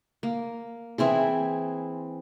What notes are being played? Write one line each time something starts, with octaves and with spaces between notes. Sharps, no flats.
A#3
E3 C4 E4 G#4